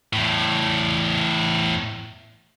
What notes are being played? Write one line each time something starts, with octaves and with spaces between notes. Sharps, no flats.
E2 A2